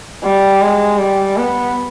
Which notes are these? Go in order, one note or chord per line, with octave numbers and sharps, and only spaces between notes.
G3
G#3
G3
B3